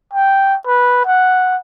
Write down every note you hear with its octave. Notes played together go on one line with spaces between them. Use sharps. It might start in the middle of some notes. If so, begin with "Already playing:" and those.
G5
B4
F#5